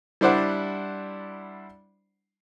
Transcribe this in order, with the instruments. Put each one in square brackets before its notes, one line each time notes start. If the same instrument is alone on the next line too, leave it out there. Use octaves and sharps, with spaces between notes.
[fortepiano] G3 D4 E4 C5 D5 F#5